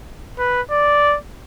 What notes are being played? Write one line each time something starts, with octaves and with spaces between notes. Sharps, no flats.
B4
D5